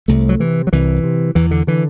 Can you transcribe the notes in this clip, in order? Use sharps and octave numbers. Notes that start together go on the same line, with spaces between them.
C2 A3
F#3
C3 E3
F#3
C2 E3
C3
E2 E3
D3
D3 E3